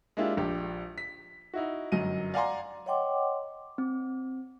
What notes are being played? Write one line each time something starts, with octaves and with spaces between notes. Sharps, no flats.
G#3 A#3 D4 E4 F4 G4
A#1 D4 G4
B6
D#4 E4 F#4
G1 F#2 F#3 D#5 D#7
D5 F5 F#5 G#5 A#5 C6
C#5 D#5 F#5 G5 C6 D6
C4